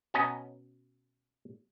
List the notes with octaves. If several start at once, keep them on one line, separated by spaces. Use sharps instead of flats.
B2 B3 C#4 D#5 A#5